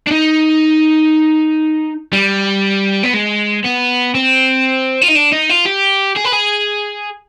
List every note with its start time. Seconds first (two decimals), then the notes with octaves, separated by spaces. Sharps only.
0.07 D4
0.11 D#4
2.13 G3
3.03 B3
3.14 G#3
3.64 B3
4.15 C4
5.02 F4
5.08 D#4
5.16 D4
5.33 D#4
5.50 F4
5.66 G4
6.17 G#4
6.25 B4
6.33 G#4